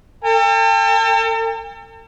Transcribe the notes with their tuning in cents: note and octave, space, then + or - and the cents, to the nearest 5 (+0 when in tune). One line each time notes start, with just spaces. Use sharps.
A4 +40 G5 +45